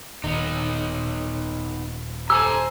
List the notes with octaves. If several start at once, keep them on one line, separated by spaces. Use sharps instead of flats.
D#1 D#3 B3 D#4
G4 A4 C5 G#5 A#5 E6